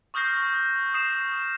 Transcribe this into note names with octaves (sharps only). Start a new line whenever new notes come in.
C#6 D#6 F6 G6 A#6 C7
D#6 C7 E7